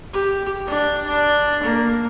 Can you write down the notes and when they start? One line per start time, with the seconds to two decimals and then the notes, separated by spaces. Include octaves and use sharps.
0.13 G4
0.67 D4
1.07 D4
1.63 A#3